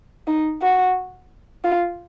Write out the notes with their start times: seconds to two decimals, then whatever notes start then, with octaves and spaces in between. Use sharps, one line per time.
0.27 D#4
0.62 F#4
1.64 F4